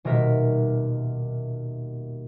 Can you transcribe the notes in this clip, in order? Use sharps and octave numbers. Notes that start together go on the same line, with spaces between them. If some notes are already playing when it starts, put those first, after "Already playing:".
D#1 B2 A#4 E5